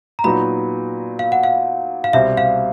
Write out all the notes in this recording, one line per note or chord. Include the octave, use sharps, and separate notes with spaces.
A#5
A#2 F#3 B3 D#4 F#4 B5
F5
F#5
F5
F5
C2 B2 G3 C4 E5
F5